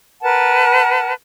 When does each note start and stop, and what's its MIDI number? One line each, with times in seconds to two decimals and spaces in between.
0.21 1.12 70
0.21 1.12 71
0.21 1.12 78
0.21 1.12 81